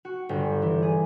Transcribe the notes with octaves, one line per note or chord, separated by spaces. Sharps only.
F#4
G1
E3
G#4